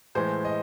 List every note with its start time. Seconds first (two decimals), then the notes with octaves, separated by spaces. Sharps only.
0.15 A2 E3 G#3 C5
0.45 D#5